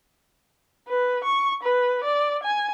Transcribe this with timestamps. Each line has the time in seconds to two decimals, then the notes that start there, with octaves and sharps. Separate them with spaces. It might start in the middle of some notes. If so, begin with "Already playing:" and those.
0.89 B4
1.24 C#6
1.63 B4
2.04 D5
2.43 G#5